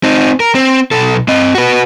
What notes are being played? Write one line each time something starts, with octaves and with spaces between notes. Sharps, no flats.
C4 D#4
A#4
C4
B1 A4
C4 D#5
F#4 B4